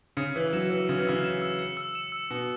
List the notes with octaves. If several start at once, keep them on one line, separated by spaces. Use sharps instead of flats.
C#3 C#7
E3 E6
F#3 E7
E3 E6
C#3 C#7
E3
C#3 E6
E7
E6
C#7
E6
E7
E6
B2 C#7